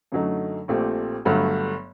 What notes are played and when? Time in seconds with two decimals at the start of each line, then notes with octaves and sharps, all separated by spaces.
0.12 F#2 D3 F#3 A3 D#4
0.68 A#1 A#2 A3 C4 G4
1.25 G1 G2 F#3 A3